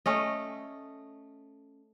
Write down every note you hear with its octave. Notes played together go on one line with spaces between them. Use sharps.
A3 C#4 D#5